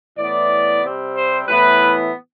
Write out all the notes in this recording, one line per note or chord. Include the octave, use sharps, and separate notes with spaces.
A2 E3 B3 D5
C3 G3 C4
C5
A2 E3 B3 B4